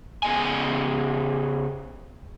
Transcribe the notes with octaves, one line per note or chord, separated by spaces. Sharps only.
C#3 B3 D#5 G#5